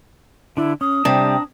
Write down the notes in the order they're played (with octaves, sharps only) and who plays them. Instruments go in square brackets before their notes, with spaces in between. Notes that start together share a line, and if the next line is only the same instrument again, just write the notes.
[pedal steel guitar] D3 D4 [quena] E4
[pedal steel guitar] C#4 [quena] D#6
[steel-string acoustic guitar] C3 G3 [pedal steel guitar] D4 A5 A#5